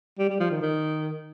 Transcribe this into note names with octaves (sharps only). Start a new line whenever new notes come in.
G3
G3
F3
D#3
D#3